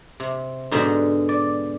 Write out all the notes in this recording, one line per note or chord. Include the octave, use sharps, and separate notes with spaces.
C3
G#2 B2 D3
D5